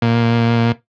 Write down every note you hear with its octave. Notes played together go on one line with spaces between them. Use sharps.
A#2